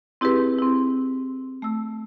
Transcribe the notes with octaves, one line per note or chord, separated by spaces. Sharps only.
C4 E4 G4 G#4 B4
C4 E4
A3 E6